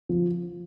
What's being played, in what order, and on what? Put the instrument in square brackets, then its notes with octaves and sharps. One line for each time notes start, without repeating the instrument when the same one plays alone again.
[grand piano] F3